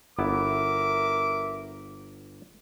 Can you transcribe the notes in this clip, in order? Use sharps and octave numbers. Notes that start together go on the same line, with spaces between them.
G1 B3 E4 A#4 E5 D6